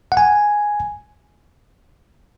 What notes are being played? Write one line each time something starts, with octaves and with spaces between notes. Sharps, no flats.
F#5
G#5